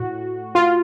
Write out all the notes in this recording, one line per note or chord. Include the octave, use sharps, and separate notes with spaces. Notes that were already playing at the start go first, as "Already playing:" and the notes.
Already playing: A2 F#4
F4